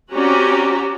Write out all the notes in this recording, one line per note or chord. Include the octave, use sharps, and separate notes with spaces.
C4 C#4 F#4 G4 D5 A#5